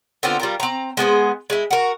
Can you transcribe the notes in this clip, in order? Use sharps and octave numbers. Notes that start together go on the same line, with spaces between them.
D3 B3 C4 F4
G3 F4 A#4
C4 A#5
G#3 B3 G#4 C5
G#3 E4
F#4 A#4